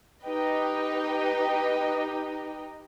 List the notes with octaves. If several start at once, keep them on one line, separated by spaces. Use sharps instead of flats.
D#4 G4 B4 D#5 G5